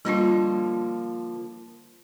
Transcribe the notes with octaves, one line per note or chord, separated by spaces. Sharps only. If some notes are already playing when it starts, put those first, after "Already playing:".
D3 F3 G3 A#3 D4 F4